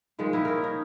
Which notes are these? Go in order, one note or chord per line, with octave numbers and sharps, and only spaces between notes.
G#2 D#3 F3 G#3
A#3 D#4 E4
C#4 A#4
D#4